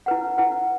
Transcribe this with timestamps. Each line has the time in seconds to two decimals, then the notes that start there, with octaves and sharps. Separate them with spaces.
0.06 E4 B4 F#5
0.38 E4 B4 F#5